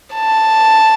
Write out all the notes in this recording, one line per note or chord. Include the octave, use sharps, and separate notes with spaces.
A5